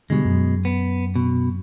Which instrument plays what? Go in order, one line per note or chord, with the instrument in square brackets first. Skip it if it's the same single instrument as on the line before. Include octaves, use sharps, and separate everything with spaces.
[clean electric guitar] B2 G#3 [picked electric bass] D3 D#3 G3
[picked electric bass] F#2
[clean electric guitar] B3
B2